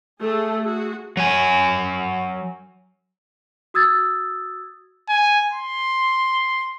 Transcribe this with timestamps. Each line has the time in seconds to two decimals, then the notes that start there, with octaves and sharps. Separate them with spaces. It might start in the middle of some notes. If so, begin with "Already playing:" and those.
0.22 A3 G#4 A4
0.65 F#4 G#4
1.17 F#3 G#5
3.74 F#4 D#6 E6 G#6 A6
5.09 G#5
5.53 C6